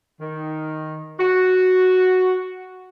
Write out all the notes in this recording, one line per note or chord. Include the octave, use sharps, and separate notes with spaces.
D#3
F#4